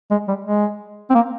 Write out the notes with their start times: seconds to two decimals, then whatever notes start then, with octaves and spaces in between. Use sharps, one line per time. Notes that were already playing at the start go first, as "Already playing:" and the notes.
0.11 G#3
0.28 G3
0.44 G#3
1.10 C4
1.15 A#3